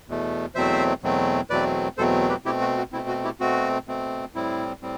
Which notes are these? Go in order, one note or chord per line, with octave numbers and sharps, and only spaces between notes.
E2 B2 A3
E2 B2 F#3 A3 C4 C5 E5
E2 B2 F#3 A3 C4
E2 B2 F#3 A3 C4 B4 D5
E2 B2 F#3 A3 C4 A4 C5
G4 B4
B2 A3 C4 E4 G4
F#4
F#4
B2 A3 C4 E4
F#4
E4 G4
B2 A3 C4 F#4
B2 A3 C4
A2 G3 C4 E4
A2 G3 C4